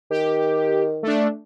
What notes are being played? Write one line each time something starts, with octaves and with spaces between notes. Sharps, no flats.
D#3 G4
A3 D4